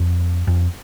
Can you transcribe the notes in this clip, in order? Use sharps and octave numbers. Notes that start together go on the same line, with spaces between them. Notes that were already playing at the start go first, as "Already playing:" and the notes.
Already playing: F2
F2